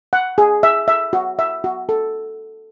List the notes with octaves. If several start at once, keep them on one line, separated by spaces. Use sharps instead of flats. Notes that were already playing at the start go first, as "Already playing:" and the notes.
F#5
G#4
E5
E5
F#4
E5
F#4
A4